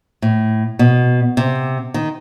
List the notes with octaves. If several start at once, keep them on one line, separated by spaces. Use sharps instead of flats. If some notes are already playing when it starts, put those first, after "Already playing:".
A2
B2
C3
D#3